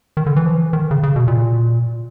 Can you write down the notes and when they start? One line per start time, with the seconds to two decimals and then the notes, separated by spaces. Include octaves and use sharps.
0.17 D#3
0.26 D3
0.36 E3
0.45 F3
0.54 E3
0.73 D#3
0.91 C#3
1.03 C#3
1.16 B2
1.28 A#2